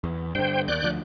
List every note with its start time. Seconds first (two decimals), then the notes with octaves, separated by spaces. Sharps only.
0.04 E2
0.35 G2 D3 C5 G5
0.68 D#2 D5 F#6 G6
0.83 D2 F3